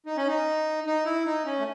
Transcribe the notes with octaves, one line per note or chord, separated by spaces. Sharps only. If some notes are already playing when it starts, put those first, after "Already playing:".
D#4
C#4
D#4
D#4
E4
D#4
C#4
A3